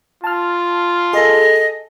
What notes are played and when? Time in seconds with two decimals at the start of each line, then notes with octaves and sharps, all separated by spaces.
0.24 F4 A5 F6
1.13 G#4 A4 D#5